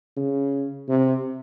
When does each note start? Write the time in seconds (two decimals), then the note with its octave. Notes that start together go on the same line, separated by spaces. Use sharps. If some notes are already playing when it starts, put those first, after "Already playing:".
0.17 C#3
0.89 C3